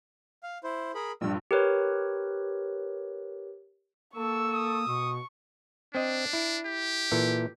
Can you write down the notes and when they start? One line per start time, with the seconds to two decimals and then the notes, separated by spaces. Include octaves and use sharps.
0.43 F5
0.64 E4 C5
0.95 G#4 A#4 B5
1.21 A#1 G2 E6
1.51 G4 A#4 B4 C#5
4.16 A#3 A4 C#6 E6
4.54 D#6
4.87 B2 C#6
5.95 C4 D4 D#5
6.33 E4
6.66 G4
7.12 A#2 E3 A4